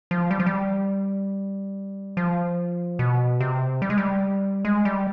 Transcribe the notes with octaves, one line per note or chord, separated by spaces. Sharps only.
F3
G3
F3
G3
F3
B2
C3
G3
G#3
G3
G#3
G3